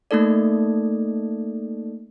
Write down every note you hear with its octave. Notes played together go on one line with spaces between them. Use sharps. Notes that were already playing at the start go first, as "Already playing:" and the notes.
A3 A#3 D#4 A4 D5